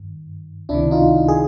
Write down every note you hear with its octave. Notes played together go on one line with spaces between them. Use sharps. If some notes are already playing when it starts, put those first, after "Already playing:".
Already playing: G2 D#3
C#2 C3 D#3 D4 E4
D#4 F4
G#4